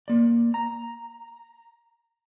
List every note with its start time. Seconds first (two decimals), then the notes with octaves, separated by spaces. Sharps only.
0.08 A#3 D5
0.54 A#5